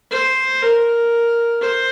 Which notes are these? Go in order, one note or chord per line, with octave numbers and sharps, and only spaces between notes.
C5
A#4
C5